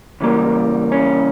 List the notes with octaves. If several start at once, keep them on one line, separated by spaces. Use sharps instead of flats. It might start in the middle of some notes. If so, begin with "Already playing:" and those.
C#3 E3 G3 A#3
C#4